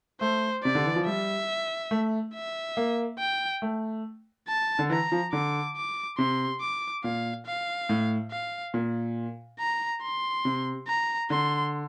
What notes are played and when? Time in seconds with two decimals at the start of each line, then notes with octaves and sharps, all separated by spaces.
0.21 A3 C5
0.63 C3 D5
0.75 D3
0.86 E3
0.96 F3
1.06 G3 E5
1.91 A3
2.35 E5
2.77 A#3
3.19 G5
3.62 A3
4.48 A5
4.79 D3
4.90 E3 A#5
5.12 F3
5.33 D3 D6
5.76 D6
6.18 C3 C6
6.60 D6
7.04 A#2 F5
7.46 F5
7.89 A2
8.31 F5
8.74 A#2
9.59 A#5
10.02 C6
10.45 C3
10.87 A#5
11.30 D3 C6